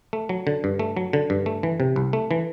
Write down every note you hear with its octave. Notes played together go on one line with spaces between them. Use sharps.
A3
F#3
D3
G2
A3
F#3
D3
G2
A3
E3
C3
C2
A3
E3